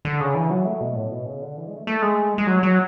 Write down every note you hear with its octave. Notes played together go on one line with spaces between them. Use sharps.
D3
C#3
E3
F#3
A3
B2
A2
B2
C#3
D3
E3
G#3
A3
A3
G#3
G#3
F#3
F#3